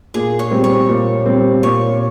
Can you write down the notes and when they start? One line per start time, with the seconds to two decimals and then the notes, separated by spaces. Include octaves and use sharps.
0.14 A#2 G#4
0.39 C#5
0.51 G3 C4
0.64 C#5
0.89 A#2
1.26 G3 C4
1.63 A#2 C#5